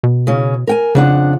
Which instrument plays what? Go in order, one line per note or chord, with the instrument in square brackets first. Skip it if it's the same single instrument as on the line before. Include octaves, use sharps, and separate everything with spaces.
[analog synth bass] B2
[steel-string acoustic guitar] C#3 C#4
A#4 G5 G#5
[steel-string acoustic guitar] F2 D4 F#5 [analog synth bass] C#3